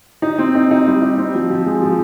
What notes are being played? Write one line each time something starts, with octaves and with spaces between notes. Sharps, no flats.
D#4
C4
D#4
D#4
G3
D#4
C4
F3
F3
G#3
F3